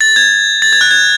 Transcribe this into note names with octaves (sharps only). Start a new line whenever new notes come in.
A6
G#6
A6
G#6
F#6
G#6